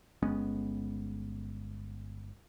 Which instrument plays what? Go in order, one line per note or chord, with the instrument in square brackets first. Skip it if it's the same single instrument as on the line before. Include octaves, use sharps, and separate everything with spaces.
[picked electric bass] G1 G#3 B3 C#4